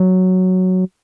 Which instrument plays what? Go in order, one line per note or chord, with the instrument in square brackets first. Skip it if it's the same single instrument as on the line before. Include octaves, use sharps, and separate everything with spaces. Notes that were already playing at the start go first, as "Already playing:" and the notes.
Already playing: [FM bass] F#3